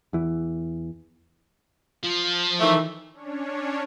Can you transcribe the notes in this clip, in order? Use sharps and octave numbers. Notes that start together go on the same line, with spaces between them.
E2 E3
F3
D#3 E3 A3
C#4 D4 C#5